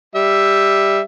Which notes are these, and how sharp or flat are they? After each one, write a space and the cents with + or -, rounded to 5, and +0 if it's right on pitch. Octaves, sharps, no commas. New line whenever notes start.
G3 +5 E5 +0